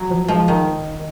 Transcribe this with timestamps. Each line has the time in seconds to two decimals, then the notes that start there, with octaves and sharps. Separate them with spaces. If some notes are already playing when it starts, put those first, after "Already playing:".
Already playing: F#3
0.10 F3
0.28 F3 G#3
0.48 D#3